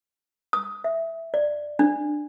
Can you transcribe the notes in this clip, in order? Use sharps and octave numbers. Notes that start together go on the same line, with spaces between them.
D#6
E5
D5
D4